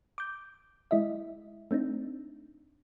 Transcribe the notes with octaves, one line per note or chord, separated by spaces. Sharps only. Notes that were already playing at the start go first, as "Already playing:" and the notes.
D6 G6
G#3 E4 D#5 E5
A3 C4 D4 D#4